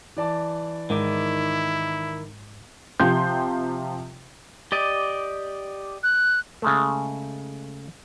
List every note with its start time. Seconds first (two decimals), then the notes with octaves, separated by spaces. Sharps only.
0.17 E3 D5 A5
0.90 G#2 D#3 E4 D6
3.00 C3 F3 G4 C6 G6
4.72 G4 D5 D#5
6.03 F#6
6.62 C#3 G#3 A3